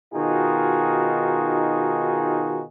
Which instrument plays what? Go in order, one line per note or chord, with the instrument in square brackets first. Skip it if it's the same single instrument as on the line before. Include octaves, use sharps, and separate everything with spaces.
[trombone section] B2 D#3 D#4 F4 F#4 G#4